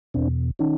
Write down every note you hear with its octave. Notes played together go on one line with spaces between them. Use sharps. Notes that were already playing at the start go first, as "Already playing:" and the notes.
E2 B2 C4 D4
D#3 C#4 D#4